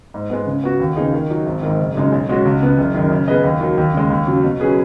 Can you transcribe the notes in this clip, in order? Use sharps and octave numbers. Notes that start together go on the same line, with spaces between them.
G#2
G#3 B3
C#3
B3 F#4
D#2
C#3 B3 D#4 G#4
D#3
F#3 D#4 F#4
G#1
G#2 D#3
F#1
F#2 C#3 G#3 D#4
B1
B2 G#3 C#4 F#4
C#2
C#3 B3
F#1
F#2 D#3
C#3
B3 G#4 B4 D#5
D#2
D#3 F#3
D#2
C#3 G#3
D#2
C#3 F#3
B2
F#3 C#4 G#4 B4